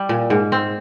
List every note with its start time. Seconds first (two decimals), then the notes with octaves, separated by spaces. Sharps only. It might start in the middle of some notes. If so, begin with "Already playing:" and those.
Already playing: G3
0.09 A#2
0.30 G#2
0.52 C4